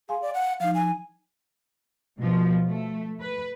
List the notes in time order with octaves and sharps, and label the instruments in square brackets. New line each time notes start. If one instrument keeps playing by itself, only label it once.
[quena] G#4 [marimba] F5 G#5 C6
[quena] D5
F#5
[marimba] F3 D#4 [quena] F5
[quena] G#5
[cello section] B2 F3
A3
B4